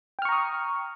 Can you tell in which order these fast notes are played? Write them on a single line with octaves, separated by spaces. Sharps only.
G5 F6 C#6 A#5 D#6